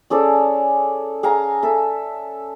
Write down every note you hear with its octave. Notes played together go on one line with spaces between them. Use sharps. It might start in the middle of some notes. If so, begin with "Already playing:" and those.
C#4 G#4 A4 D5
G#4 F5 G#5 A#5
A4 E5